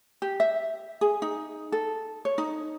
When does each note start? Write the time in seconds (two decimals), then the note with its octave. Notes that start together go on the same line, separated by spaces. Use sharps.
0.22 G4
0.40 E5
1.01 G#4
1.22 D#4
1.72 A4
2.25 C#5
2.38 D#4